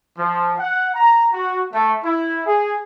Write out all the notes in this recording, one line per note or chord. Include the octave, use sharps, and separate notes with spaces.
F3
F#5
A#5
F#4
A3
E4
G#4